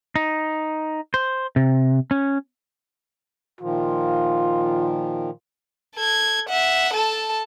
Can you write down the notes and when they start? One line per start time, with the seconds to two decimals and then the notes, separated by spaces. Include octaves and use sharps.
0.16 D#4
1.14 C5
1.56 C3
2.11 C#4
3.61 A#2 D#3 F3 F4
5.96 A4 G#6
6.49 E5 F#5
6.94 A4 A5